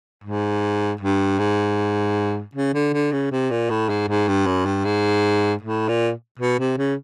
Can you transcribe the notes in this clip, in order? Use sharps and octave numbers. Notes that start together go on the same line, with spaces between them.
G#2
G2
G#2
C#3
D3
D3
C#3
C3
A#2
A2
G#2
G#2
G2
F#2
G2
G#2
A2
A#2
B2
C3
C#3